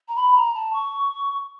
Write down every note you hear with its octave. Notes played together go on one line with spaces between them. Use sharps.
A#5
B5
A#5
A5
C#6